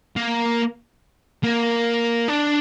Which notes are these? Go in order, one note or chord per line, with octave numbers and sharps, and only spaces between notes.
A#3
A#3
D4